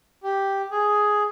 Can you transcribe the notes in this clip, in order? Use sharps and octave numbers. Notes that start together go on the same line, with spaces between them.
G4
G#4